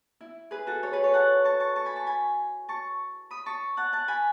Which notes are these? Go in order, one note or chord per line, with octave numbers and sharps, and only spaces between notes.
E4
G#4 B4
F#4 A4
A4 C#5
G#4 B4
A4 C#5
F#5 A5
A5 C#6
A5 C#6
A5 C#6
G#5 B5
A5 C#6
G#5 B5
A5 C#6
B5 D#6
A5 C#6
F#5 A5
F#5 A5
G#5 B5